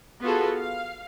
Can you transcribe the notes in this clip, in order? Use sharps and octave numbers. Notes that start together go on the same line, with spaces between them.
B3 F4 F#4 G#4 A4
F5